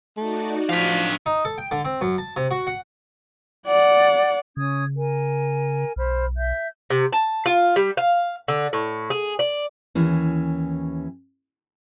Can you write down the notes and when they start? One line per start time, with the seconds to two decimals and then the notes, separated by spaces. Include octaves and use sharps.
0.17 A3 D#4 F#4 D5
0.69 F3 D4 F5 F6 B6
1.26 D#4
1.45 A4
1.58 G5
1.71 D3
1.85 C4
2.01 F#2
2.18 A5
2.36 C3
2.51 F#4
2.67 F#5
3.67 D5 F#5
4.57 C#3 C#4 D#6 G#6
4.96 A#4 G#5
5.96 B1 C5 B5 F6
6.36 E5 G6
6.90 C3
7.13 A5
7.46 F4
7.76 G3
7.97 F5
8.48 D3
8.73 A2
9.10 G#4
9.39 D5
9.95 D#2 E3 C#4